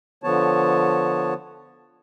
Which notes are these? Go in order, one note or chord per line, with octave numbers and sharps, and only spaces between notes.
D3 F3 B3 C#5 A5